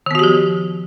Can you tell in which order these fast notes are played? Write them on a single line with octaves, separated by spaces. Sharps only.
D#3 B3 F#4 G4 F3